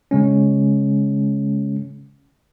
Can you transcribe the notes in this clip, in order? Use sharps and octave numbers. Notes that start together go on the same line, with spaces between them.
C#3 G#3 C#4